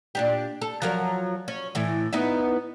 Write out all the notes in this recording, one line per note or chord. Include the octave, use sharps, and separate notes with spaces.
A#2 D4 G4
A4
F3 F#3 A#4
C#4
A2 E3
B3 D#4 E4